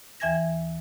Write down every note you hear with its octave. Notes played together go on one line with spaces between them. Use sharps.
D#2 E3 E5 G#5 G#6 A#6